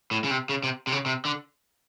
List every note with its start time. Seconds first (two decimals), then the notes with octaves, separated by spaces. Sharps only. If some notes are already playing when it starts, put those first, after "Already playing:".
0.11 A2
0.24 C#3
0.31 C3
0.49 C#3
0.63 C3
0.87 C3
0.92 C#3
1.06 C3
1.25 D3